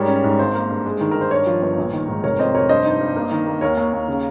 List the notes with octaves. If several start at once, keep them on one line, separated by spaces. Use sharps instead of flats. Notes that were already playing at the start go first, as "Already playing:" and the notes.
Already playing: G#2 G3 A#4 C#5
C#4
G#2
G#1 C5
A#3
G2
G#3
D#3
D#3 A#4
C5
G2 A#4 C#5
F3
G1
A#1
D#3
G#2
F1 A#4 C#5
F2 C5 D#5
F1 A#4 C#5
G2 C5 D#5
D#4
G2
A#3
D#3
A#3
D#2 A#4 C#5
D#2
D#2
C#3